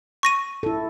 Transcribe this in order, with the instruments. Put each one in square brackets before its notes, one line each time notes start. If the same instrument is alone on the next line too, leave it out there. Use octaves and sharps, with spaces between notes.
[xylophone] C#6 A#6 D#7
[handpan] E4 A4